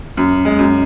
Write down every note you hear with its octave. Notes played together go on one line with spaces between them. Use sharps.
F#2
G#3
F#2